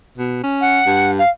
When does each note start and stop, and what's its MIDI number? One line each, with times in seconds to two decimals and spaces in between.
0.18 0.38 47
0.43 0.81 61
0.61 1.11 78
0.86 1.21 43
1.18 1.29 77